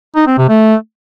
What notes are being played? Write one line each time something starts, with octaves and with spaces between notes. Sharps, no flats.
D#4
C4
C3
A3